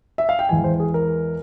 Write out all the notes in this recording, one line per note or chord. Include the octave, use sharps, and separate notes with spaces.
E5
F5
G5
E2 E3 G#3 G#5
C5
G#4
A#4